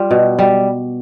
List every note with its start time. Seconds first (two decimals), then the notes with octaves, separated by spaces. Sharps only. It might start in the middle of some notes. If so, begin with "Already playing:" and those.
Already playing: G3 F4
0.11 B2
0.39 G3